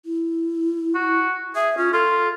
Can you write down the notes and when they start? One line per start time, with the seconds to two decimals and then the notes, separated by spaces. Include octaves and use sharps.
0.06 E4
0.95 F#4
1.55 G#4 E5
1.78 C#4 F4
1.93 F4 A4